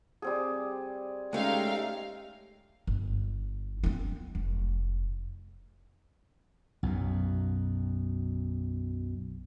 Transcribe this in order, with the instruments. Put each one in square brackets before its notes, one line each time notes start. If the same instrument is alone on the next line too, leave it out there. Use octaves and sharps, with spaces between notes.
[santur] G3 C4 G#4
[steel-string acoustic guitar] G#3 A3 C#4 [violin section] D#4 F5 G5 [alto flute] G4
[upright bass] G1
B3 C4
F1
[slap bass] B1 F#2 B2